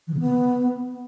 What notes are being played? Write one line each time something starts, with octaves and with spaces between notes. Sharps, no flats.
E3
C#3
B3